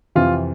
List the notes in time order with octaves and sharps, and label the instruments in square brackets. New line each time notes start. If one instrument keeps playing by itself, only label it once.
[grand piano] F2 C3 E3 F4